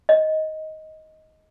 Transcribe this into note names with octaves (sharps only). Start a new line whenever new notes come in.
D#5